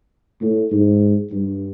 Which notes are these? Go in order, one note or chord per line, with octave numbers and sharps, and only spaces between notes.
A2
G#2
G2